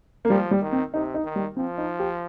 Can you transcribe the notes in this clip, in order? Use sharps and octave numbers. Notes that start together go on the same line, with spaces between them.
A#3
F3 G3
G3
D#3
C4
C3 D#4
D#4
D#3
G3
F3 C4
D#4
G4